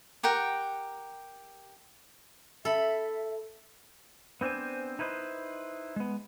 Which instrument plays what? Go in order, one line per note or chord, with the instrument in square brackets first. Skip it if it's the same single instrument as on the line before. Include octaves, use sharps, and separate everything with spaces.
[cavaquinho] G4 A#4 F#5 G5
[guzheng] A4 B5 [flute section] E5
[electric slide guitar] B3 C4 D4 C5 G#5
D#4 E4 B4 C5 D#5
G#3 B3